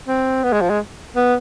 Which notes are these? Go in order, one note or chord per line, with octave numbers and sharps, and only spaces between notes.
C4
B3
G#3
F3
G#3
B3